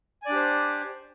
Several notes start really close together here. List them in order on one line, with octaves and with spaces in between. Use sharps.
G#5 D5 D4 G4 C5